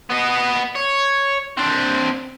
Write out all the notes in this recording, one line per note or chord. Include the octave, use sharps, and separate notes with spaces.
B3 D#5
C#5
C4 D4